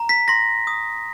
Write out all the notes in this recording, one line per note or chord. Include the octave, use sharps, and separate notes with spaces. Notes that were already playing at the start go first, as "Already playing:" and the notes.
Already playing: A#5
B6
C6 A#6
D#6